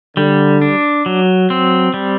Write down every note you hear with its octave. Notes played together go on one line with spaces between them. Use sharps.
D3 G3
D4
F#3
C4
G3